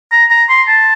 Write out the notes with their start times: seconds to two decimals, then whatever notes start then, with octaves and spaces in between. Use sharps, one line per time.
0.12 A#5
0.31 A#5
0.49 C6
0.68 A5